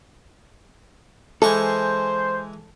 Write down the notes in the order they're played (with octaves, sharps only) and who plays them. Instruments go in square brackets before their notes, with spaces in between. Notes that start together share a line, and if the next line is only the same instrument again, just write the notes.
[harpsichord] E3 G#3 C#6 [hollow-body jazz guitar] A4 [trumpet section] C5